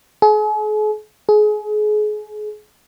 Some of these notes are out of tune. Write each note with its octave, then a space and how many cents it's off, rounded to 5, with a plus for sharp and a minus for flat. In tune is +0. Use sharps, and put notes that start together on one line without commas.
G#4 +45
G#4 +25